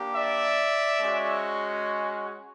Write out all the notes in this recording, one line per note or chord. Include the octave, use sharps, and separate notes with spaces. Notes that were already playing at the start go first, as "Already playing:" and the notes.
Already playing: A#3 D4 G4
D5 E5
G#3 C#4 F#4